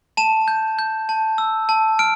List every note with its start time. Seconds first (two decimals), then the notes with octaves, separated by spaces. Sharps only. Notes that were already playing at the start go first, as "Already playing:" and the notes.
0.17 A5 E7
0.48 G6
0.79 G6
1.09 A5
1.38 E6
1.69 A5
1.99 F6 D7